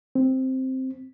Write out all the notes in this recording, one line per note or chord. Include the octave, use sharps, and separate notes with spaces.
C4